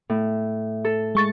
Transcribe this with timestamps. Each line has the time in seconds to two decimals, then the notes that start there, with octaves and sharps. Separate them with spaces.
0.10 A2
0.85 A4
1.15 G#3 C#6 A6